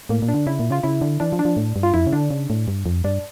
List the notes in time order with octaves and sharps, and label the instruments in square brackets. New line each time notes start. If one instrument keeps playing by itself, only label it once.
[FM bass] A2 [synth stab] A#3
[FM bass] A#2
[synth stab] D4
[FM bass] D3
[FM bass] C#3 [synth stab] E4
[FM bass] A#2
[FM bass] C#3 [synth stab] F4
[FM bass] C#3 [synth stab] E4
[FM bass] D3
[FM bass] E3 [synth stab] D4
[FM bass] F3
[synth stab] D4
[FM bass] F3
A2
G2
[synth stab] F4
[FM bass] F2 [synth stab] E4
[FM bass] C#3
[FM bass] D3 [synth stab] D4
[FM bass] C#3
A2
G2
F2
[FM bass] G2 [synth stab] D4